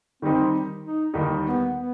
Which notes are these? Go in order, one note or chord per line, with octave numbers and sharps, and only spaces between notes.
D#3 G3 C4 D#4 G4
D#4
D#2 D#3 G3 D#4 G4
B3
B3